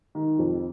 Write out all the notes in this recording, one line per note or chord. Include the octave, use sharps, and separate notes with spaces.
D#3
F2